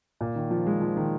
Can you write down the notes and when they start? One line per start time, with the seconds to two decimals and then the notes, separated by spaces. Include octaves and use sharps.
0.21 A#2
0.35 D#3
0.51 F3
0.67 G#3
0.82 F3
0.96 D#3